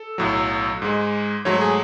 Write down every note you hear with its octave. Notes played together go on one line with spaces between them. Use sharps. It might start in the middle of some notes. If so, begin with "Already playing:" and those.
Already playing: A4
B1 A2 F#3
G#2 G#3
G#2 F#3 A3 C#5
G#4